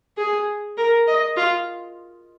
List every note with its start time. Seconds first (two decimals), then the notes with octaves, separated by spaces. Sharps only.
0.17 G#4
0.77 A#4
1.07 D#5
1.37 F4